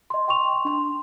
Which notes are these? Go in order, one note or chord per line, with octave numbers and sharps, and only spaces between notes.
D#5 C6
G5 C6 C#6 F7
D4 C6